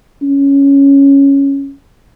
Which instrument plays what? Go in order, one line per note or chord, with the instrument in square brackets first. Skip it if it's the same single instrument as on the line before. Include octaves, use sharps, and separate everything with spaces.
[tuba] C#4